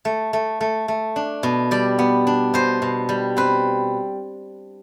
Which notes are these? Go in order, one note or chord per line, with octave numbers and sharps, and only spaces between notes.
A3
A3
A3
A3
D4
B2
G3 D5
B3
D4
B2 C5
B2
G3
C4 B4